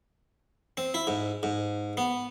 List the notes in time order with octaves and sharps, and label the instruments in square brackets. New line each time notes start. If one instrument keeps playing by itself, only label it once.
[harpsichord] C4
E4
G#2
G#2
B3